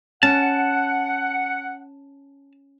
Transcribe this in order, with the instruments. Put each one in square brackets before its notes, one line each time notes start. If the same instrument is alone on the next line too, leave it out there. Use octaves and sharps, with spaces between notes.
[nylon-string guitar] C#4 [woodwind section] F#5 [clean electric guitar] A5